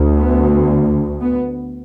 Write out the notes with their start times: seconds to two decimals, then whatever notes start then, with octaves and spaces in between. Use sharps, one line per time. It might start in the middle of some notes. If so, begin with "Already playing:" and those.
Already playing: D2
0.18 B3
1.20 B3